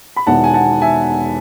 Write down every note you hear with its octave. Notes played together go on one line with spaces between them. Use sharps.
B5
E1 E2 D#3 F#5 A5
G#5
F#5 A5
E5 G#5